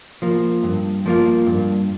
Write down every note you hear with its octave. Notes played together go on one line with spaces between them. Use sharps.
F3 A#3
G2
F3 A#3 F4
G2